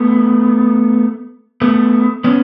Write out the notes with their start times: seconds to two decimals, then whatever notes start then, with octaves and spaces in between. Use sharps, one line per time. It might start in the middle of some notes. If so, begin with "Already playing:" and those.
Already playing: A3 B3
1.61 A3 B3
2.24 B3 C#4